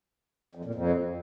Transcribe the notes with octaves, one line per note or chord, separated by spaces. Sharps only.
F2
A#2
F2